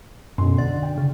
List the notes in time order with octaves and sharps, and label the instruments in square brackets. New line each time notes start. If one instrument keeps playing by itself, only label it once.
[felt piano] B1 C6 [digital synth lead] F#2
[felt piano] D3 [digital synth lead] D5
[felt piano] G5
[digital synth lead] C#3